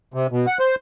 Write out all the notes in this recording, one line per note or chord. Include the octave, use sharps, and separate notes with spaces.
C3
B2
F#5
C5